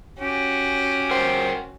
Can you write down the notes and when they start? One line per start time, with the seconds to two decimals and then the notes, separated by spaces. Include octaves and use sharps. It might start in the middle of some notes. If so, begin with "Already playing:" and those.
0.19 C#4 F#4 G4
1.11 A#4 C5 F#5 G5